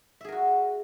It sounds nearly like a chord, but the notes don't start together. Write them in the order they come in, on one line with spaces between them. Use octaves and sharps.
E5 G#4 A#4 F#4